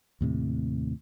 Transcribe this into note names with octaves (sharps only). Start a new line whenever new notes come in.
D#2 A2 C3